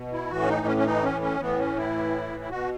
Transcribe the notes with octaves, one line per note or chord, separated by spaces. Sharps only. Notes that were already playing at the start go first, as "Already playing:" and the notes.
Already playing: B2
E4
A2 E3 F#4
C#4
D#4
C#4
C#4
D#4
C#4
C#4
A2 E3 B3
C#4
E4
E4
B2 F#4